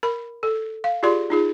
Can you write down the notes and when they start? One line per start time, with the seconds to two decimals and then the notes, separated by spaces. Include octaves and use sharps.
0.03 A#4 B5
0.43 A4
0.84 F5
1.03 F4 G4 G#4 D5 C6
1.30 D#4 F4 G#4